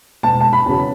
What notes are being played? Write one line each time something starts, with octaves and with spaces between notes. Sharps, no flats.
E1 A5
A5
B5
E2 C#3 F#3